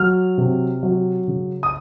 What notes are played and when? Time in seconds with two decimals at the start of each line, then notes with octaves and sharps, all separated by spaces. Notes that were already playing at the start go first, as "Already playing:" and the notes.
Already playing: F#3 F6
0.38 C3
0.83 F#3
1.28 C#3
1.63 D#6